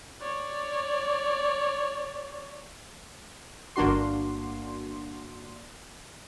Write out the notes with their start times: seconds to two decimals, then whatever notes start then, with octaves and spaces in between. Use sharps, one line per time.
0.21 C#5 D5
3.76 G1 A#3 D4 F#4 C6